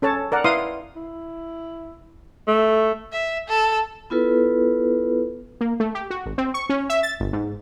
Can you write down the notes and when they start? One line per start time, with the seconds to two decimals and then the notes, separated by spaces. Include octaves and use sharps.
0.02 C#4 A4 C#5 A5
0.32 A#4 D5 F#5
0.44 E4 B4 F5 C6 D#6
0.96 E4
2.47 A3
3.12 E5
3.49 A4
4.10 B3 E4 F4 A4 B4
5.61 A#3
5.80 A3
5.95 G4
6.10 F#4
6.26 G#1
6.38 C4
6.54 C#6
6.69 C#4
6.90 E5
7.03 A6
7.20 G1
7.33 G#2